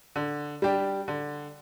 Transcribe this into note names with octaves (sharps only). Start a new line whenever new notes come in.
D3
G3 D4 G4
D3